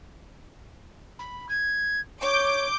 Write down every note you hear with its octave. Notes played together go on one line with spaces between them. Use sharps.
B5
G#6
C#5 D6 G6